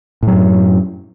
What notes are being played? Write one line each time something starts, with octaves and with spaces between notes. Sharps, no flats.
F#2 A2 F#3